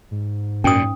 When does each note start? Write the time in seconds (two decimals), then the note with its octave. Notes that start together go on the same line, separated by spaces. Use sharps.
0.11 G#2
0.64 F#2 A#2 C#4 D#6